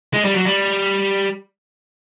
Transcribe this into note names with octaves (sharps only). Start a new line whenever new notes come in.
G#3
G3
F#3
G3